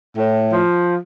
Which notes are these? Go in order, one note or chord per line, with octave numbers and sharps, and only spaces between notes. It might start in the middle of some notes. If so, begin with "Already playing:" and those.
A2
F3